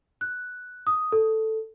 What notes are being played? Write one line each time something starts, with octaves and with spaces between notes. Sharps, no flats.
F#6
D#6
A4